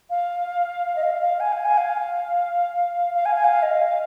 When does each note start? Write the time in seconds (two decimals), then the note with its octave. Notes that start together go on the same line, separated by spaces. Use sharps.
0.10 F5
0.96 D#5
1.03 F5
1.22 F5
1.40 G#5
1.53 F5
1.65 G#5
1.78 F5
3.14 F5
3.25 G#5
3.36 G#5
3.44 F5
3.62 D#5
3.81 F5